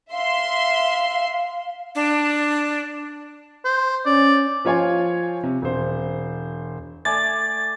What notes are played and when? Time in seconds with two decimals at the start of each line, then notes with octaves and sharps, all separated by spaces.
0.12 E5 F5 C6
1.95 D4
3.65 C5
4.06 C#4 D5
4.65 F3 F4 C#5 G#5
5.43 C3
5.62 E1 C5
7.05 A3 D5 G#5 A6